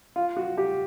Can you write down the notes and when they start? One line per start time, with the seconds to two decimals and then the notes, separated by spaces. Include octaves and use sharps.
0.16 F4
0.37 F#4
0.58 G4